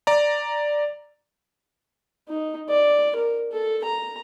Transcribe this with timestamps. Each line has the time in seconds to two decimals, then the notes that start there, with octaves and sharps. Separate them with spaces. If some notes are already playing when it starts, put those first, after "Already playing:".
0.07 D5 A#5
2.28 D#4
2.69 D5
3.16 A#4
3.52 A4
3.85 A#5